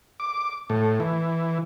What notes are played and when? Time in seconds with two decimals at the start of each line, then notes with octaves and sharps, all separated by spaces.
0.20 D6
0.70 A2
1.00 E3